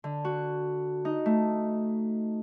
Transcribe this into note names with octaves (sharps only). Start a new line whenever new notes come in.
D3
F#4
D#4
A3